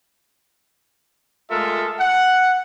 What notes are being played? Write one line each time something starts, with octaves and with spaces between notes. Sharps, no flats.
G#3 A3 F4 A4 A#4 E5
F#5